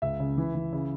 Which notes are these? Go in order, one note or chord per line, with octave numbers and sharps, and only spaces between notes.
C#2 E5
C#3
E3
E3
C#3